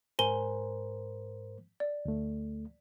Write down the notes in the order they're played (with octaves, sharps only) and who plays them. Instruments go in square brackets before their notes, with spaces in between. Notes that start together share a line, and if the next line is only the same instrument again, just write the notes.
[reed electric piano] G#2 A#4 C5 [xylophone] G#5 G7
[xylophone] D5
[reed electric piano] D2 A3